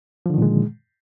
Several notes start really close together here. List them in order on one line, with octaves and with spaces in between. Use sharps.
F3 D3 D#3 A#2 G#3